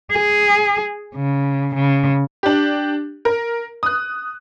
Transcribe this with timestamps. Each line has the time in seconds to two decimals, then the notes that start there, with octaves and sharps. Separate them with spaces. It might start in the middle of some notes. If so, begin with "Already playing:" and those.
0.12 G#4
1.15 C#3
1.75 C#3
2.43 D4 G4
3.25 A#4
3.83 D#6 F#6